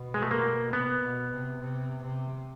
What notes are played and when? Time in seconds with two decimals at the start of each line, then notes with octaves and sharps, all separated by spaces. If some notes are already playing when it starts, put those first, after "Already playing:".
Already playing: B2
0.14 G#3
0.22 A3
0.31 A#3
0.73 C3 B3
1.02 B2
1.31 C3
1.60 C3
2.02 C3